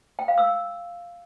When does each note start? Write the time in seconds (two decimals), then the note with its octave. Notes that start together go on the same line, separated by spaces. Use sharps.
0.19 G5
0.28 F5
0.38 E6